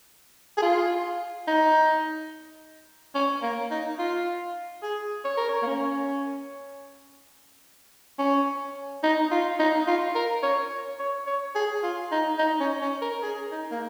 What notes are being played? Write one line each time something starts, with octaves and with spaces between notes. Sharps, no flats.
G#4
F4
D#4
C#4
A#3
D#4
F4
G#4
C#5
A#4
C#5
A#3
C#4
C#4
D#4
F4
D#4
F4
A#4
C#5
C#5
C#5
G#4
F4
D#4
D#4
C#4
C#4
A#4
G#4
D#4
A#3